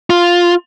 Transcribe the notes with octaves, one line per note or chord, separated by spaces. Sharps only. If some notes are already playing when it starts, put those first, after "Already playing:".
F4